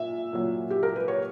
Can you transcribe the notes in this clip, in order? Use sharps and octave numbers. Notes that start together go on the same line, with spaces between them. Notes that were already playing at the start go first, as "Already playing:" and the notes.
Already playing: A#2 E5
A#2 F#3
G4
A#4
B4
C#5